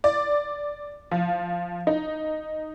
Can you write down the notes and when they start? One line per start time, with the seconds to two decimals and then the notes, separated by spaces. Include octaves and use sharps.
0.04 D5
1.11 F3
1.87 D#4